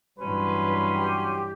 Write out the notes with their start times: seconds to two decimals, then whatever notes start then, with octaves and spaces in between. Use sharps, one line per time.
0.19 G2 E3 F#3 C#4 B4 C6
0.90 G4